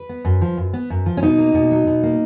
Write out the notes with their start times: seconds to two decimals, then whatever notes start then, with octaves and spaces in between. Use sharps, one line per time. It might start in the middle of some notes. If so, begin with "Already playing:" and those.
Already playing: B4
0.09 B3
0.25 F#2
0.41 F3
0.57 F#2
0.73 B3
0.90 F#2
1.06 F3
1.17 C#4
1.23 B2 D#4
1.38 A#3
1.55 B2
1.71 F#3
1.87 B2
2.03 A#3